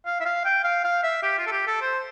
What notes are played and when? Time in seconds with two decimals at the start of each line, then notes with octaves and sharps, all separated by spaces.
0.06 F5
0.20 E5
0.25 F5
0.45 G5
0.64 F5
0.84 F5
1.03 E5
1.23 G4
1.38 F4
1.47 A4
1.52 G4
1.67 A4
1.81 C5